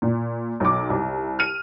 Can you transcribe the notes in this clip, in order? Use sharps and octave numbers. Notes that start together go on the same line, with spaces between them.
A#2
B1 D6
C2
F6 D#7